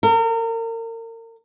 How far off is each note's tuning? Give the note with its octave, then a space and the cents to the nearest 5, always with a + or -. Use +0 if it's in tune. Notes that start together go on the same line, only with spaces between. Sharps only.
A#4 -35